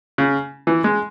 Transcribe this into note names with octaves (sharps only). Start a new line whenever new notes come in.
C#3
E3
G#3